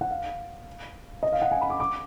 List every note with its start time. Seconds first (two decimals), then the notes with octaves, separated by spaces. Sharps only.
0.01 F#5
0.11 F5
1.23 D#5
1.32 F5
1.42 F#5
1.51 G#5
1.61 B5
1.70 D6
1.80 D6